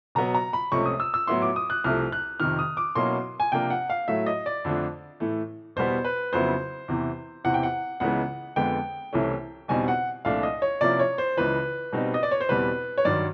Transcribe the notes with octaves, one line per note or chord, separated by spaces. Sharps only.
B2 F#3 B3 A#5
A#5
B5
C#2 C3 F3 A3 C#4 C#6
D#6
E6
E6
A2 F#3 B3 E4 C6
D6
D#6
F#6
C2 C3 F3 A3 F6
F#6
F2 C3 D#3 F6
D#6
D6
B2 F#3 A#3 C#4 E4 C6
G#5
C3 F3 A#3 D4 G5
F#5
F5
A2 F#3 A3 E5
D#5
D5
F2 D3 F3 A3 D4
A2 E3 A3
E2 B2 G3 B3 C5
B4
F2 C#3 F#3 B3 E4 C5
E2 C3 E3
E2 C3 E3 F#5
G5
F#5
C#2 C#3 E3 G#3 B3 F#5
F2 D3 F3 G#3 B3 G5
C2 C3 E3 A3 C#4
E2 B2 G3 C4 D#4 G#5
F#5
C2 A#2 F3 A3 D4 F5
D#5
C#5
C3 F3 A#3 C#4 E4 D5
C#5
C5
C#2 C#3 E3 B4
B2 G3 C4 D#4
D#5
D5
C#5
C5
E2 B2 G3 C4 B4
C#5
G2 D#3 F#3 D5